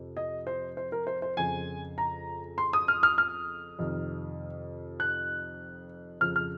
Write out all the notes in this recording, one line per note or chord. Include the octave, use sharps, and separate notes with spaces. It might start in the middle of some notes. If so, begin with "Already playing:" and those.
Already playing: F2 C3
D#5
C5
C5
A#4
C5
C5
F2 C#3 F3 G#5
A#5
C6
D#6
F6
F6
F6
F2 C3 D#3
F#6
F2 C#3 F3 F6
F6